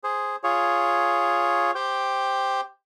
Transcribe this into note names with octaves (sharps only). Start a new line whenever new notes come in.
G#4 C5
F4 G#4 C#5
G4 C5 G5